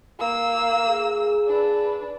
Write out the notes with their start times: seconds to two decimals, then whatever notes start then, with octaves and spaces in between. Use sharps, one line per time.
0.19 A#3 E6
0.87 G#4
1.47 D4 B4